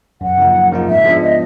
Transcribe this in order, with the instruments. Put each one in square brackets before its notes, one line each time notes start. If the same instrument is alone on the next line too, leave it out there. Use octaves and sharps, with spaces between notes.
[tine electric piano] F#2 [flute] F#5
[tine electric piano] C#3 F3 A#3 D#4
F#2
C#3 F3 A#3 D#4
[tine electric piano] G#2 [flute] E5
[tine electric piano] F3 G#3 B3 D4
[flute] D#5